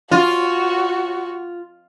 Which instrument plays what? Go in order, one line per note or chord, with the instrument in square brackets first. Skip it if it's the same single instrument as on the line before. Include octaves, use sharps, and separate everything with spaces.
[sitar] F4 [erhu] F#4